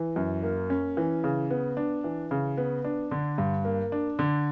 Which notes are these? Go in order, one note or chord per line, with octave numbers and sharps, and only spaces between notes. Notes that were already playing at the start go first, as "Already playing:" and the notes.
Already playing: E3
F#2
A#3
C#4
E3
C#3
B3
D4
E3
C#3
B3
D4
D3
G2
A#3
D4
D3